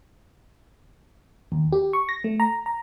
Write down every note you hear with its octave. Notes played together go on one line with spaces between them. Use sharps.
D#2
G4
C#6
A#6
A3
A#5
A#5